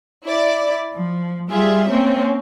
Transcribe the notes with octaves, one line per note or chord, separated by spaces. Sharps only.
E4 D5
F3
G3 F4 G#4 E5
A#3 C4 C#4